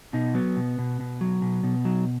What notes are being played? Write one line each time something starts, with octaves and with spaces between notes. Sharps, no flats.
B2 D#4
F#3 B3
B2
B2
B2
F#3
B2
B2
F#3